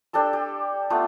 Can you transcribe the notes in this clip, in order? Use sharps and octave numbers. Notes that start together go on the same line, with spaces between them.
D4 G4 A4 E6
G4
A3 B3 F4 A4